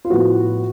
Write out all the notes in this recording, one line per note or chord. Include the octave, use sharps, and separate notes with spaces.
F4
A2 F3 B3 F#4